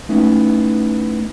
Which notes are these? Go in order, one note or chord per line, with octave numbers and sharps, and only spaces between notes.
A3 B3 C#4 D#4 E4